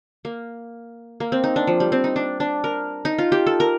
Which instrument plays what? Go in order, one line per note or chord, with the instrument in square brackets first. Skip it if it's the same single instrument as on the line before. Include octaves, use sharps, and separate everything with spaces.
[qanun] A#3
A#3
C4
D#4
D4
F3
G3
C4
D#4
D4
D4
A#4
D#4
F4
G4
A4
A#4